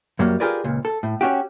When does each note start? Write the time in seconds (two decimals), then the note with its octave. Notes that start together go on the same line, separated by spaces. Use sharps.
0.19 F#2 F#3 G3 A#3
0.40 F4 G4 G#4 A#4 B4 D5
0.64 C#2 A#2
0.85 A4
1.03 A2
1.21 C#4 D4 F#4 G4